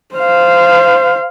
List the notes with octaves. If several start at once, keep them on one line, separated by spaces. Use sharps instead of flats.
C5 F5